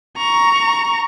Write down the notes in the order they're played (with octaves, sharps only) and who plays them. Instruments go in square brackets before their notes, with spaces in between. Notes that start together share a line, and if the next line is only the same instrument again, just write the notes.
[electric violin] A#5 C#6